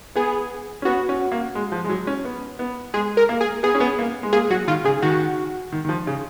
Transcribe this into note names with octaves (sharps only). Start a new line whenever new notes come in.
B3 G#4
C#4
B3 F#4
C#4
A#3
G#3
F3
G#3
F#3
C#4
B3
B3
G#3 G#4
A#4
A#3
G#4
B3 G#4
C#4
B3
A#3
G#3
A#3 G#4
F#3 F#4
D#3 F4
C#3 G#4
D#3 F#4
D#3
D#3
F3
C#3